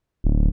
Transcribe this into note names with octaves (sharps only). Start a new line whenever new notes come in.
D1